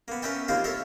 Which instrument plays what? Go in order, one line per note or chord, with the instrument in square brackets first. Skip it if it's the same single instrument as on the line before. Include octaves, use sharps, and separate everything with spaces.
[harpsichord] A#3 B3
C#4 A#4 B4 E5 G5 A5
D#2 A#3 C4 F4 C5 F5
A4 A#4 C#5 E5 F5